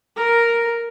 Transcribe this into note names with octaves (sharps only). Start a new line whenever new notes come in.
A#4